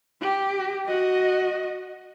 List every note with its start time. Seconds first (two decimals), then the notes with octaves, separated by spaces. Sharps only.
0.21 G4
0.86 F#4 D#5